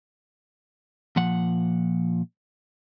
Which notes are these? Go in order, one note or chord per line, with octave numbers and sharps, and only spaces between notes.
A#2 F3 F#5